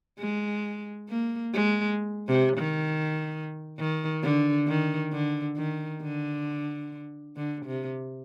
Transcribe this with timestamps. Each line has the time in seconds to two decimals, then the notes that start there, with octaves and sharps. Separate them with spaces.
0.19 G#3
1.09 A#3
1.54 G#3
2.28 C3
2.58 D#3
3.78 D#3
4.23 D3
4.67 D#3
5.12 D3
5.57 D#3
6.02 D3
7.37 D3
7.66 C3